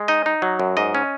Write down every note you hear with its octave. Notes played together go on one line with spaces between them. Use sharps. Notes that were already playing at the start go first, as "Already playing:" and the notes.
Already playing: G#3
D#4 D#5
D#4
F#3
F#2
G#2 D#5
C#4